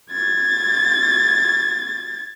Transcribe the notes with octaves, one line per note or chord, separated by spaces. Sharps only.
G#6 A6